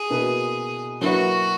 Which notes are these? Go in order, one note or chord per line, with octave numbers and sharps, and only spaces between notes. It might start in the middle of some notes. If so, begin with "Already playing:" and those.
Already playing: G#4
B2 A#3 E4 B4
F#3 A#3 E4 F#4 B4